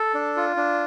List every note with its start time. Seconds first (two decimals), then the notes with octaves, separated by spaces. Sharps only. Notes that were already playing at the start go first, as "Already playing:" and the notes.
Already playing: A4
0.14 D4
0.36 F4
0.57 D4